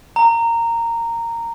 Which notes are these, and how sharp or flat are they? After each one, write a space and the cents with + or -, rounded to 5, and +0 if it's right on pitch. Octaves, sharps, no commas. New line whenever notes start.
A#5 -10